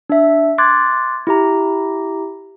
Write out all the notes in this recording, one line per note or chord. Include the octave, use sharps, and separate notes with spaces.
D4 E5
C6 D6 F#6 G#6 A6
E4 G4 A#5